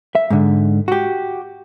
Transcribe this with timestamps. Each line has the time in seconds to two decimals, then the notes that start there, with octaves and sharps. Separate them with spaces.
0.15 E5
0.30 G#2 D3
0.88 F#4 G4